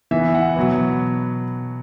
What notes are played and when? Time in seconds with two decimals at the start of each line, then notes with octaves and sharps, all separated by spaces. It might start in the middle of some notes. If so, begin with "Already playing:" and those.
0.11 E3 B3 E5
0.35 F#5
0.56 B2 F#3 B3